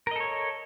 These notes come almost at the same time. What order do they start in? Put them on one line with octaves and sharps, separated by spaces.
A#4 D#5 A4 C#5